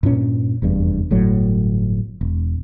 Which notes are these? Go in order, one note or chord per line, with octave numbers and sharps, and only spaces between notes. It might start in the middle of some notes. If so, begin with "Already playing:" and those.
G2 A#2 C#4
F1 E2 G2
G1 A2 F#3
E1